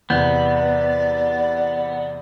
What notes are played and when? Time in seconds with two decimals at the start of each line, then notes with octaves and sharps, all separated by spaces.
0.10 E2 C3 B3 D5 G6